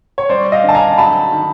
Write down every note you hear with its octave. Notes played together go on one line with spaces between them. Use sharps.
C#5
G3 C5 D5
D#5 F5
D3
A5
G#5 A#5
F#3 A5 B5
D#3